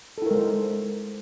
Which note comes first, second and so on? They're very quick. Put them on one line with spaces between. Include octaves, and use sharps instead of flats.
A4 E4 A#4 G#3 C5